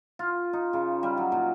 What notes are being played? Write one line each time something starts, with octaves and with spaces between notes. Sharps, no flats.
F4
D#4
C#3
G3
F#3
A#2